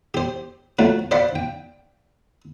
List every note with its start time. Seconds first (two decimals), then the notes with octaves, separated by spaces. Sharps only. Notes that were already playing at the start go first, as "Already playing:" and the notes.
0.14 G4 C5
0.79 F3 F#3 A3 F#4
1.11 C5 D5 F5 F#5 B5
1.35 G5